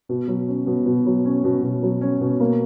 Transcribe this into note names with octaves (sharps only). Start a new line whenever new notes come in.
B2
F#3
C#4
B2
B2
F#3
C#4
B2
B2
F#3
C#4
B2
A#3